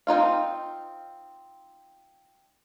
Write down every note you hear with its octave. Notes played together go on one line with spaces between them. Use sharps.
C4 D#4 F4 F5